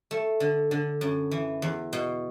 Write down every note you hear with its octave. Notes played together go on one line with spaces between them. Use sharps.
A3
D3
D3
F#2
E3
E2
B2